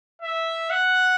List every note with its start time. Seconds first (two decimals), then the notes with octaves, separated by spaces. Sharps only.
0.22 E5
0.70 F#5